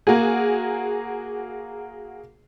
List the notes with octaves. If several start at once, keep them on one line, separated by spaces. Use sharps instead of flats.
A#3 F#4 G#4